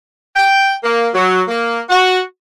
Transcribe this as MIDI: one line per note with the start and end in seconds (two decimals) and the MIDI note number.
0.36 0.73 79
0.84 1.09 58
1.14 1.41 54
1.48 1.79 58
1.90 2.20 66